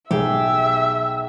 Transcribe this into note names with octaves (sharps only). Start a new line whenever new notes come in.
B1 G4 G#4 E5